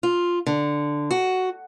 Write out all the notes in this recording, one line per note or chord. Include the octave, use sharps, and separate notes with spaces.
F4
D3
F#4